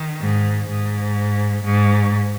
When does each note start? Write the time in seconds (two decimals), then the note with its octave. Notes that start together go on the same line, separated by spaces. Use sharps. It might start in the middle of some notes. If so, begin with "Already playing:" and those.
Already playing: D#3
0.21 G#2
0.69 G#2
1.64 G#2